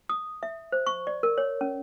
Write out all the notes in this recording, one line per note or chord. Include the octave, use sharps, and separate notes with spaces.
D#6
E5
C5
C#6
D5
A#4
C#5
C#4